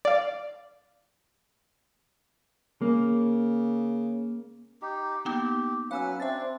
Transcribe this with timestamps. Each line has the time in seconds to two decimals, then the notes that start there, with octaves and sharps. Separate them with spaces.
0.05 D5 F5
2.82 C#3 A#3
4.82 D#4 G4
5.25 A#3 B3 D#4 G4
5.91 F#3 C#4 B4 F5 G#5 E6
6.20 C4 D4 E5 A6